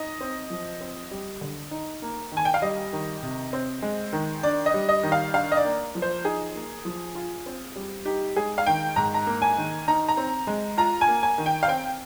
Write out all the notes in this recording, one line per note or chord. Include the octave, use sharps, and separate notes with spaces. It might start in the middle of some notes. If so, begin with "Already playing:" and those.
Already playing: D#4 D#5
C4
F3
C4
G3
D3
D#4
A#3
D#3
G#5
G5
F5
G3 D#5
D#3
C3
C4
G#3
D#3
D4 D5
D#5
G3
D#5
D#3
F5
D4 F5
D#5
D5
A#3
F3
C5
D#4 G#4
A#3
F3
F4
C4
G3
D#4 G4
G#3 G#4
F5
D#3 G5
G#2 A#5
A#5
A#3
G#5
D#3
D#4 A#5
A#5
C4
G#3
F4 A#5
G#5
A#3
G#5
D#3
G5
F5
C4 G5